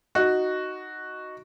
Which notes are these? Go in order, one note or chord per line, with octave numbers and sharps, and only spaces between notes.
D#4 F#4